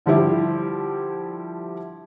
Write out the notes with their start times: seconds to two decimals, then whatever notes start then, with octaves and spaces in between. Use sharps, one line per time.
0.06 D3 F3 G3 E4 G4